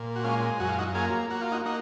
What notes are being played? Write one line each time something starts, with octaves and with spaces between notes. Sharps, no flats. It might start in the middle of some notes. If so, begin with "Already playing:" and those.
Already playing: A#2
F#4
G#3 C#4 F4
F#2 F#4
F4
D#4 F#4
A#3 F4 G#4
A#3 F#4
F4
D#4 F#4
A#3 D#4 F#4